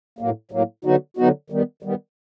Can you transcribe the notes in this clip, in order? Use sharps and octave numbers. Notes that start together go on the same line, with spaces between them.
A2 F#3 A#3
A2 F#3 A#3
D3 F#3 B3 D#4 F#4
D3 F#3 B3 D#4 F#4
D#3 G3 B3
D#3 G3 B3